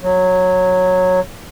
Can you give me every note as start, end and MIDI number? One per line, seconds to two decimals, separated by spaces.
0.01 1.20 54